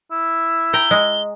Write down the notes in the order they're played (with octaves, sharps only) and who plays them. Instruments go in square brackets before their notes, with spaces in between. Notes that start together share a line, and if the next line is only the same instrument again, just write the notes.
[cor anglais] E4
[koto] G5 A#5 [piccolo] G7
[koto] G#3